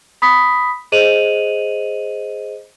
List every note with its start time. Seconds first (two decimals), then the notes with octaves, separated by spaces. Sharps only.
0.22 B5 D#6 B6
0.92 G#4 C5 D#5 D#7 F7 F#7